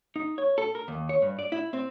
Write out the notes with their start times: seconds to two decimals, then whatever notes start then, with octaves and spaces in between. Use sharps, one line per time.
0.16 D#4
0.38 C#5
0.58 A4
0.75 A#4
0.88 D#2
1.09 C#5
1.22 G2
1.39 D5
1.52 E4
1.73 C4